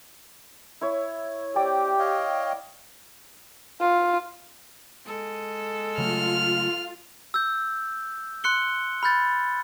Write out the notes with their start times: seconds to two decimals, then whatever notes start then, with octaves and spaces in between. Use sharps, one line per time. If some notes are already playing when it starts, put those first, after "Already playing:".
0.81 E4 C#5
1.56 C4 G4 D5 G5
1.99 C#5 D#5 F5
3.80 F4
5.06 G#3 A4
5.98 C#3 F#3 A3 F4 F6
7.34 E6 G6
8.44 C6 F#6 C#7 G7
9.03 B5 F6 G6 A6